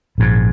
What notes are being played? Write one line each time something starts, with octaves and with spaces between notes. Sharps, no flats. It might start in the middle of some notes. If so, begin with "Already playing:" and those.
A#1 G#2